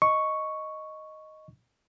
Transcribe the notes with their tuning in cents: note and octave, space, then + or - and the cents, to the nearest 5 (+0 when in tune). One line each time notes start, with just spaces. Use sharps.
D#5 +0 C#6 +0